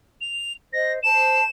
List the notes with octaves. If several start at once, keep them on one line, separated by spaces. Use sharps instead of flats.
F7
C5 D#5 A#6
C5 A5 E7